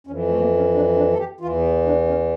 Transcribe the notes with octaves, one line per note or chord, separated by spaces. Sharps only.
F2 E3 C#4
A3
A#3
C#4
D4
D4
A4
G4
E2 E3 F4
D4
C#4